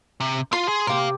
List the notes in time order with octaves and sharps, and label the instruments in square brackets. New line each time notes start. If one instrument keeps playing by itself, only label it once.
[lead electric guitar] C3
[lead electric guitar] F4 [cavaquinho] C6
[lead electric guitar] G#4
[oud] C3 G4 [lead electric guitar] A#4 F5